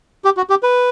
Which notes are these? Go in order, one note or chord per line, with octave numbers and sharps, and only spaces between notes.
G4
F#4
G4
B4